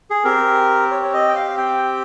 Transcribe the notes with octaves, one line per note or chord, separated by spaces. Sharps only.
G#4
C4 G4 A#4
C#5
C#5
D#5
G5
F5
G5